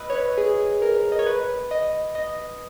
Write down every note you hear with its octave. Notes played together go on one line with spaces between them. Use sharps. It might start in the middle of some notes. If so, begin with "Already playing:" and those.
Already playing: B4 D#5 E5
C#5
B4
G#4
A#4
D#5
C#5
B4
D#5
D#5